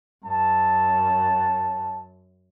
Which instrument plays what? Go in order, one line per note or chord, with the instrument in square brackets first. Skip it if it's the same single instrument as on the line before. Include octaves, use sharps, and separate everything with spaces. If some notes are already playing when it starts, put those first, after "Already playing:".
[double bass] F#2 [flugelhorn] A5